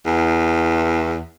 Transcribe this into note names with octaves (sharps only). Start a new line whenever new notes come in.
E2